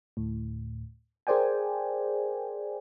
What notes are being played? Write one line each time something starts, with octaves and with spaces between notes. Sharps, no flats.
D2 A2
G#4 A#4 C5 D5 G5 G#5